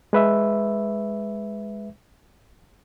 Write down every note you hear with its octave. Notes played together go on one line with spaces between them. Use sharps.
G#3 B4 E5